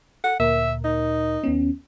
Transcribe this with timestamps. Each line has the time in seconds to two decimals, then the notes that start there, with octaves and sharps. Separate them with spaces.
0.24 A4 F#5
0.40 D2 A#2 A#4 E5
0.84 D#4
1.44 D#2 B3 C#4